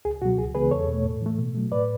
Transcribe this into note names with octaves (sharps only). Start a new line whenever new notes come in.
C#2 G#4
B2 F#3 F#4
C#2 G#4
C#3 E3 G#3 B3 G#4 B4
E2 A4 C#5
B2 A3
A2
E3 A3
B2
F#3 A3
A2 B4 D5